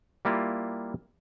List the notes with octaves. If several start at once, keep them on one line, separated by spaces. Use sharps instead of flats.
G3 A#3 E4 F4